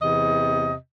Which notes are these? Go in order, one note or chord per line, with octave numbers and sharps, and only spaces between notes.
E2 C3 D#5